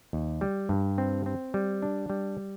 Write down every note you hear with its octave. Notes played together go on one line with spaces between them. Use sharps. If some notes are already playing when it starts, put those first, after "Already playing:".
D#2
G3
G2
C4
C4
G3
D4
G3